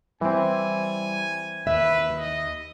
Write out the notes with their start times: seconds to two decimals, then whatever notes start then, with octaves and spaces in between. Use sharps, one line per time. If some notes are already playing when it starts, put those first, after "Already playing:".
0.21 E3 G3 C4 G#5
1.67 D#2 B4 E5
2.16 D#5